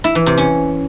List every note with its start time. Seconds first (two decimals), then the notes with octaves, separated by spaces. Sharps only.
0.04 E4
0.15 E3
0.26 C3
0.38 C#4